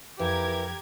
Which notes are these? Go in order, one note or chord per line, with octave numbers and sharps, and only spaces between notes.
F2 E3 G4 A#4 G#6